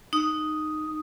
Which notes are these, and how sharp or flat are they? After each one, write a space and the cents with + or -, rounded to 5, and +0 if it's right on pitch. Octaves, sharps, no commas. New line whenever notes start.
D#4 -15 D#6 +0